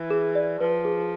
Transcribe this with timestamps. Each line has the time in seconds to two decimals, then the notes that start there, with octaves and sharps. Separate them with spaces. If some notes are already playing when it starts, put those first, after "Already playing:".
Already playing: E3
0.10 G#4
0.35 D5
0.60 F3 B4
0.85 G#4